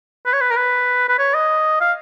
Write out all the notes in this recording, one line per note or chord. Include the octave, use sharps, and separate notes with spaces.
B4
C#5
B4
A#4
B4
B4
C#5
D#5
F5